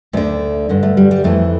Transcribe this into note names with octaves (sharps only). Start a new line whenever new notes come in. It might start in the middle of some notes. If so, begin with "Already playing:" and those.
D2 D3 A3
G2 D3
A3
G3
G3
F2 E3 A3